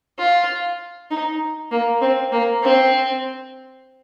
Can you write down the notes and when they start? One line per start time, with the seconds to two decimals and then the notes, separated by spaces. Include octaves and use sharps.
0.18 F4
1.10 D#4
1.71 A#3
2.01 C4
2.32 A#3
2.63 C4